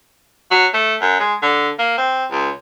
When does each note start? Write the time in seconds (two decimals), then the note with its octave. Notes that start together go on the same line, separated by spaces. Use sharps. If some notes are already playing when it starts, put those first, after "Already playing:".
0.51 F#3
0.74 A3
1.01 F#2
1.20 G#3
1.42 D3
1.79 A#3
1.98 C4
2.31 C#2